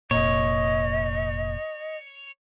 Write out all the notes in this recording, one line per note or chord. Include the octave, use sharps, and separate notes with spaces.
F1 A#2 C#5 D#5